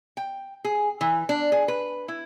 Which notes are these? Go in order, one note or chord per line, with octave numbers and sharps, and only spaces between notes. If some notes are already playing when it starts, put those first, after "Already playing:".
G5
G#4
E3
D4
G#4
B4
E4